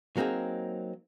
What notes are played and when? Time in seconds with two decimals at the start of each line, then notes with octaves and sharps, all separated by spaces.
0.17 F#3 A#3 C4 D#4 G#4